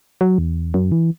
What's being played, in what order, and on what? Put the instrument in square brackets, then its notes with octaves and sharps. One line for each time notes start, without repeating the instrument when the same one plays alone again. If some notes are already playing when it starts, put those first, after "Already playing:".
[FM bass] F#3
E2
F#2
E3